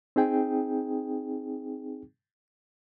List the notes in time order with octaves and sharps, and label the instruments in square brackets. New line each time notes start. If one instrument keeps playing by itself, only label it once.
[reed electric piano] C4 D#4 G#4 G5